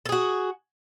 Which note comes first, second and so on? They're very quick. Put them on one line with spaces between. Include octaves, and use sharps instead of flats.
A4 G#4 F#4